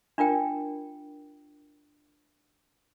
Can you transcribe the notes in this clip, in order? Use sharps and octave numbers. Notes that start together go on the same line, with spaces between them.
D4 F4 A#4 G5